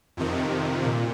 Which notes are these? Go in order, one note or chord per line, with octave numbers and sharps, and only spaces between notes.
F2 C3 D#3
A#2